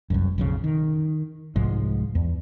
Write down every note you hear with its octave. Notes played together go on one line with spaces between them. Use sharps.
F1 C2 F#2
B1 F2 C#3
D#3
C2 G#2 F3 G#3
E2